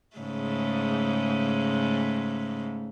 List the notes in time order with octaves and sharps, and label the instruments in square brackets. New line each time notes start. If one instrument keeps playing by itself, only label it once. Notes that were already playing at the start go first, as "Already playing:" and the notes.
[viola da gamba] G#2 C#3 A3